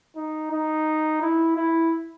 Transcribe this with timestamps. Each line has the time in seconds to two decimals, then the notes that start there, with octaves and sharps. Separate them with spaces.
0.16 D#4
0.51 D#4
1.22 E4
1.57 E4